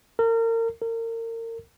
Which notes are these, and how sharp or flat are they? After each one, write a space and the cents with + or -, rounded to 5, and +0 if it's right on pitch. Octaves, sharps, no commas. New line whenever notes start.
A#4 -35
A#4 -35